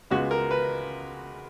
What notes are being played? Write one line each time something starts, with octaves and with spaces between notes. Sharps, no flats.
C#2 C#3 G#3 B3 F#4
A#4
B4